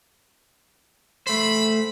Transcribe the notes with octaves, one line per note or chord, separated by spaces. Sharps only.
A3 C5 B5